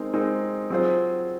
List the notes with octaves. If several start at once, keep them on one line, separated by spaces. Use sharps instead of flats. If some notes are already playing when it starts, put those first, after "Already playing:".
Already playing: G#3 C4 D#4 A#4
G#3 C4 D#4 A#4
F#3 C4 F4 G#4 C5